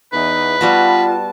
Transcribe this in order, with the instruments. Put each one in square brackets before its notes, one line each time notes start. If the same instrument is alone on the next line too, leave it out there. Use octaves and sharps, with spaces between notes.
[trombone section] E2 [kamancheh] D#4 [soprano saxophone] B4
[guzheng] G3 B3 F#4 [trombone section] F4 [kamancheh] A5